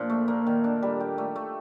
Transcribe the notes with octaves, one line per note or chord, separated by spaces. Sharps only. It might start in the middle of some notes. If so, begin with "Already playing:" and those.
Already playing: A#2 F3 D4
A3
A#3
D#3
D4
G3
G4
A3
A3